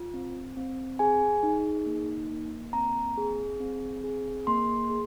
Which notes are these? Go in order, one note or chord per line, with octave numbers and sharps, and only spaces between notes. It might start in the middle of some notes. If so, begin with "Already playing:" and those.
Already playing: F4
C4
C4
G#4 G#5
D#4
A#3
A#3
C4 A#5
G#4
C4
G#4
A#3 C6
G#4